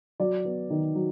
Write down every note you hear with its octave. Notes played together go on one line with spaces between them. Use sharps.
F#3 D5
B3
D#3
F#3